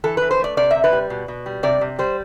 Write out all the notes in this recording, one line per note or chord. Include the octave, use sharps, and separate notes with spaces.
E3 A4
E3 B4
C5
A3 D5
C3 D5
C3 E5
B4
G3
B2
B2
G3
C3 D5
C3
G3 C5